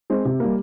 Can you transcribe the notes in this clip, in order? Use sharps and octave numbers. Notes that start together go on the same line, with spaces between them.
G#3 C4
C3
G3 A#3